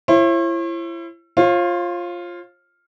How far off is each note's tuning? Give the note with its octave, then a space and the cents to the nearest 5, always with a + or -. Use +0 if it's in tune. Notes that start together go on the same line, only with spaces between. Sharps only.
E4 +35 C#5 -45
F4 +0 C#5 -45